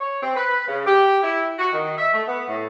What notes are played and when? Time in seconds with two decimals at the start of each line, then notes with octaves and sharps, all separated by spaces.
0.01 C#5
0.22 C4
0.36 B4
0.68 C#3
0.87 G4
1.23 E4
1.59 F#4
1.72 D#3
1.98 E5
2.14 A3
2.28 B3
2.48 A2